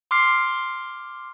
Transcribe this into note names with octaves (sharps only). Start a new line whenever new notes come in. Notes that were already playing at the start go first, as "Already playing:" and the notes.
C6 D6 F6 C7